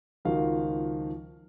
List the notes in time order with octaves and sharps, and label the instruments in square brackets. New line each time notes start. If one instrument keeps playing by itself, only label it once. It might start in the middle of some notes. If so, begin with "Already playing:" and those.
[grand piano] C#2 D#3 F3 F#4 F5